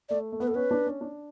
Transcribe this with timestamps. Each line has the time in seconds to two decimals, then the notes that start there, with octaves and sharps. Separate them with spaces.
0.09 A3 D5
0.32 A3
0.40 B3 B4
0.48 A4
0.51 B3
0.55 C#4 B4
0.71 D4
0.87 C#4
1.01 D4